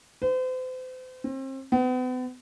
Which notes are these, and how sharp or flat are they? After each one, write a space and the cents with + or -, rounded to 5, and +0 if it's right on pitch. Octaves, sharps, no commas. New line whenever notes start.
C5 -40
C4 +35
B3 +40